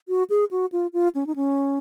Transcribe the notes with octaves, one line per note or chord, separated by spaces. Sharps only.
F#4
G#4
F#4
F4
F4
C#4
D#4
C#4